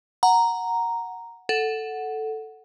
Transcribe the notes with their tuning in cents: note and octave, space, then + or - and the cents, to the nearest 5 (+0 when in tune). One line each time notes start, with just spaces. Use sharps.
F#5 +0 A#5 +0
A4 +0 F#5 +0